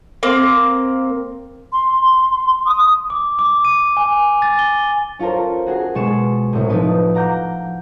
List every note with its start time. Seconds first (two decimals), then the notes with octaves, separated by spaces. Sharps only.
0.23 A#3 C4
1.72 C6
2.66 D#6
3.10 D6
3.39 D6
3.65 D#7
3.97 G#5
4.42 A6
4.59 G7
5.19 C#4 F4 A4 A#4 C5
5.66 F#4 G#4 A#4 C7
5.95 B2 G#3 G#4 C#6 A6 E7
6.53 C2 A2
6.69 F3 D#4 E4 B4 D#5
7.14 F5 F#5 A#5 D6 G6